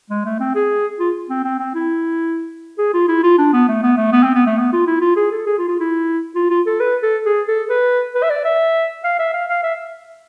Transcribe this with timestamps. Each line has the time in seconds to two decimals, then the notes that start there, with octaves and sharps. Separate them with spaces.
0.10 G#3
0.25 A3
0.40 C4
0.55 G#4
0.99 F4
1.30 C4
1.44 C4
1.59 C4
1.75 E4
2.78 G#4
2.94 F4
3.09 E4
3.23 F4
3.38 D4
3.53 B3
3.68 A3
3.83 B3
3.97 A3
4.12 B3
4.23 C4
4.35 B3
4.47 A3
4.58 B3
4.73 F4
4.87 E4
5.01 F4
5.16 G#4
5.31 A4
5.47 G#4
5.58 F4
5.68 F4
5.80 E4
6.36 F4
6.50 F4
6.66 A4
6.80 B4
7.03 A4
7.26 G#4
7.48 A4
7.70 B4
8.15 B4
8.23 E5
8.30 D5
8.45 E5
9.04 F5
9.19 E5
9.34 F5
9.49 F5
9.64 E5